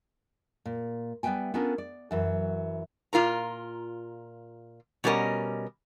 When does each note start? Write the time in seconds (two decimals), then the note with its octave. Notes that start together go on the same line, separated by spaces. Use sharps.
0.65 A#2
1.23 G3 B3 B4 E5 G5 G#5
1.54 B3 C#4 D4 F4 A4 A#4
1.78 D5
2.11 F#2 E3 F#3
3.13 A#2 F4 A#4 A#5
5.04 B2 G3 C#4 A#4 D#5